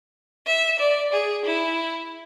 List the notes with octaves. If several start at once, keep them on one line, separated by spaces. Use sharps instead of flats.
E5
D5
G#4
E4